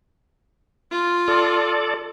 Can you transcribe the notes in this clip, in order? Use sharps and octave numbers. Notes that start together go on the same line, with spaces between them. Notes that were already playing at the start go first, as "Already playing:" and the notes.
F4
A4 D5